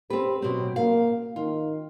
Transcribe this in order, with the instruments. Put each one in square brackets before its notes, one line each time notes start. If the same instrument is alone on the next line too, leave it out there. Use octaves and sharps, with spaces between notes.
[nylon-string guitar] C4 B4 [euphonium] G4
[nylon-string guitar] B2 C4 [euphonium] F#3
[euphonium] A#3 [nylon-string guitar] F5
[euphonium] D#3 [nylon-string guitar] F4